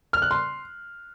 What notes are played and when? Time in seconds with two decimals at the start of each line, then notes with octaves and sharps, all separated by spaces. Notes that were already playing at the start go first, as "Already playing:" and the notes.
0.13 F6
0.22 F#6
0.31 C6